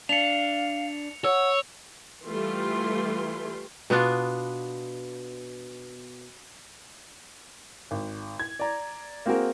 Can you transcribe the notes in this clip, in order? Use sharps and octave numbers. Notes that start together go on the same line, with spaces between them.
D4 F5 C#7 F7
C#5 F#5 E6
E3 G3 A3 F4 C6
B2 B3 D4 F4
G#1
G#6
D5 A#5
A#3 C4 F#4 G#4 A#4